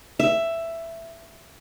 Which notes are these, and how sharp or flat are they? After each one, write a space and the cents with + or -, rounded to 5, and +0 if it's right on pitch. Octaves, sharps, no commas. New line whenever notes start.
E5 +10